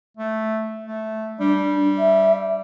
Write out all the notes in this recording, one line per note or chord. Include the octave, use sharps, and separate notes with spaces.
A3
A3
G3 D4
E5